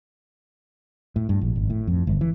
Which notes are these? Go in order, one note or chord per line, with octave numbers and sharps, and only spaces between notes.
A2
G2
A#1
G#1
A2
F2
G1
E3